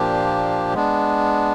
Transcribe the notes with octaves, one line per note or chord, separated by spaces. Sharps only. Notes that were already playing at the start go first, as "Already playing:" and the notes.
Already playing: A#2 F3 A#3 D4 G4
G#3 B3 D4